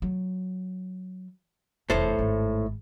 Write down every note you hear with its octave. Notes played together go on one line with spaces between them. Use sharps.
F#3
F1 E2 A2 A4 C5
G#1 G#3